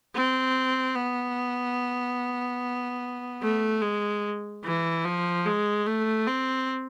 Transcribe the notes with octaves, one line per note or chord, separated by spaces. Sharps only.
C4
B3
A3
G#3
E3
F3
G#3
A3
C4